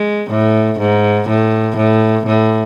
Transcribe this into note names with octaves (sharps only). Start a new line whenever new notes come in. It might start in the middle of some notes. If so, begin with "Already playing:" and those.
Already playing: G#3
A2
G#2
A2
A2
A2